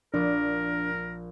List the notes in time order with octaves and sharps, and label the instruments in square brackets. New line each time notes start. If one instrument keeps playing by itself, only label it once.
[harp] A#1 D6 [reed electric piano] D4 [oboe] A#4